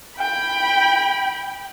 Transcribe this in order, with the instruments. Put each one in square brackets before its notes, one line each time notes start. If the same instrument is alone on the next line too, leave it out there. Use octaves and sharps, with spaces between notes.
[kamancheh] G5 B5